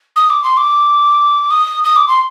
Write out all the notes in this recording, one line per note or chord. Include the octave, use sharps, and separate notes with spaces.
D#6
D6
C6
D6
D#6
D#6
D6
C6